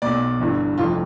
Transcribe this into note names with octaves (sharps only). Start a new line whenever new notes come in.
B1 B2 D5
G1 G2 E3
F1 F2 E3 F4